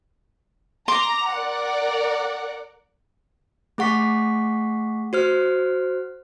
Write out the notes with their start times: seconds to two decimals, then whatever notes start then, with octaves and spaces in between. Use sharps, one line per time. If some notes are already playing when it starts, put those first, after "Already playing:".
0.88 A#5 C6 D6
1.31 A#4 D5 F#5
3.78 A3 G#4 F#5 C#6 B6
5.13 F#4 C5 F6